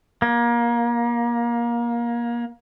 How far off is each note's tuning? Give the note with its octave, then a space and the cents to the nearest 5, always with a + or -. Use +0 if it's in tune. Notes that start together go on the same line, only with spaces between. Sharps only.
A#3 +25